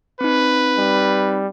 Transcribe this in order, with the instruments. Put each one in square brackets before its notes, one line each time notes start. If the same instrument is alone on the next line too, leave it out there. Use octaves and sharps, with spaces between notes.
[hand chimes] C4 D#4 [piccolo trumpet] B4
[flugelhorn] G3